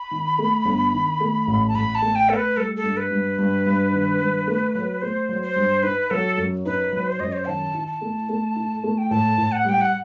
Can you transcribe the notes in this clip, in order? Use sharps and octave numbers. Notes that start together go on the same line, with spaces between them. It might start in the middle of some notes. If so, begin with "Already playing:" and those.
Already playing: B5
D#3
A3
G1
D#3
A3
A1
A5
A1 B5
A5
A3
G5
A3 A4
B4
G3 A4
A4
G2
B4
G2
G2
G2
D#3
G2
A3
F#3
A3 C5
F#3
C5
G2
D#4 B4
F#3 A4
F#2
D#4 B4
F#3
C5
F#2 D#5
C5
D#3 A5
E4
A5
A3
A3
E4
A3
G5
A2 A5
A2
F#5
G3 G5
F#5